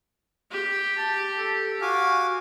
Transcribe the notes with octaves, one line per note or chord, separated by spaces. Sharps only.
G4
A5
A4
F#4 F5 G#5 D6